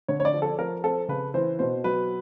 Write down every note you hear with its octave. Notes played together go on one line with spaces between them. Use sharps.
D3 C#5
C#5
D5
F3
A4
F3 A#4
C4 A4
C#3 B4
E3 C5
B2 C5
F#3 B4